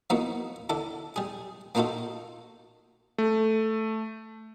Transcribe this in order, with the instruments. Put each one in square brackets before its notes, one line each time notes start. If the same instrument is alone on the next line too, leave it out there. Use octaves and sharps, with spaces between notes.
[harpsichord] F3 A#3 B3 D#4 E4 F#4
D3 D4 E4 A4
G3 G#4
A#3 D4 D#4 F4 F#4 A4
[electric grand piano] A3